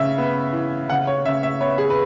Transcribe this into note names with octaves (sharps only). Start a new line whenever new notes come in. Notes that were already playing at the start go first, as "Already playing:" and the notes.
Already playing: C#3 E5
B3
E3
C#3 F#5
C#5
C#3 E5
E5
B3 C#5
G#4
B4